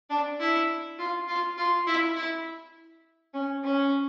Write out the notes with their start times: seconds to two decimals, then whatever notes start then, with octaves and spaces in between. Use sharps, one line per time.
0.10 D4
0.40 E4
0.98 F4
1.28 F4
1.57 F4
1.87 E4
2.16 E4
3.34 C#4
3.63 C#4